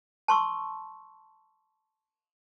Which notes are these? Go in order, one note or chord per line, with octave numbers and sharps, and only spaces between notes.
A5 C6 C#6 E6